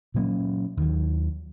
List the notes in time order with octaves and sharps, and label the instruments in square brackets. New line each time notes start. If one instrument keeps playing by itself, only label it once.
[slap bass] A#2 F#3 A#3 C#4
D#2 D#3 F#3